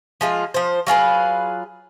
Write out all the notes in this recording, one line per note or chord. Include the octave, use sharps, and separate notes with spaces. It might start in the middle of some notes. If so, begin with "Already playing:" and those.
F3 G#3 F4
F3 C5
F#3 F4 G#4 B4